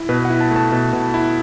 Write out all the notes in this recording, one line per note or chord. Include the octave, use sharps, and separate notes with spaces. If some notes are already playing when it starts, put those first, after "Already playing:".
Already playing: E4
B2 B4
F#5
E4
A5
A3
A5
B2
B2
E4